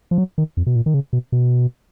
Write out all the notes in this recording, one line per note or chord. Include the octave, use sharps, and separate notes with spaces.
F3
F#3
D#3
F2
B2
A#2
D#3
C#3
B2
B2